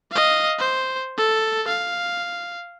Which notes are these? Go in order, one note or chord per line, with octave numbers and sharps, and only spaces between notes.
D#5 F5
C5
A4
F5